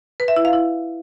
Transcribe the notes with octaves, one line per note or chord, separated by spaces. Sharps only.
B4
E5
E4
F5
E4